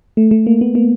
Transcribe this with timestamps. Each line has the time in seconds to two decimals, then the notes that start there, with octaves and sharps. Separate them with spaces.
0.17 A3
0.31 A3
0.47 A#3
0.61 B3
0.75 A#3